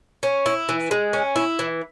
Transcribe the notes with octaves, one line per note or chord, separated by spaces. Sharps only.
C#4
E4
E3
G#3
C#4
E4
E3